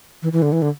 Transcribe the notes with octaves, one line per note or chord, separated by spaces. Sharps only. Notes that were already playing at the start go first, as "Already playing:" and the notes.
E3
E3
D3
E3
D3